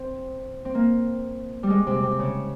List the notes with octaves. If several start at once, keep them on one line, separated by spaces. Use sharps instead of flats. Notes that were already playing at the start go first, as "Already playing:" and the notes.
Already playing: C4
C4
A#3
G3
G#3
C3
C3
C#3